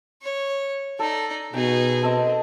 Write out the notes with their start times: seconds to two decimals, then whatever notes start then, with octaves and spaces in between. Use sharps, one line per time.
0.22 C#5
0.99 D#4 A4 D5
1.54 B2 D#4 G#4 G5
2.03 C4 A4 D#5